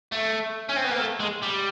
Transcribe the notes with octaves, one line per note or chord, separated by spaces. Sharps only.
A3
C#4
C4
B3
A#3
A3
G#3
G3